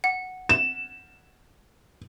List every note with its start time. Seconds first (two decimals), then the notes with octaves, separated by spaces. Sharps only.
0.04 F#5
0.49 E7